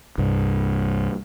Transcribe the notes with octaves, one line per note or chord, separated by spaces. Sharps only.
C2 G2